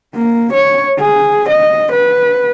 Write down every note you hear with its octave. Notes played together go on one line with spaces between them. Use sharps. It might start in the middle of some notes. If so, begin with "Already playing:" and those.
A#3
C#5
G#4
D#5
B4